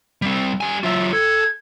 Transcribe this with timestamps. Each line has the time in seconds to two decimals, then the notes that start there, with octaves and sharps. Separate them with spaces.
0.22 G3 C4
0.61 G3 G#5
0.84 F#3 F4 E5
1.13 A4 G#6